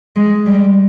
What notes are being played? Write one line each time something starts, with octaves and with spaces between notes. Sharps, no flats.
G#3
G3